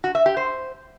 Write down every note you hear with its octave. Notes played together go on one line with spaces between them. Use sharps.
F#4
E5
G4
C5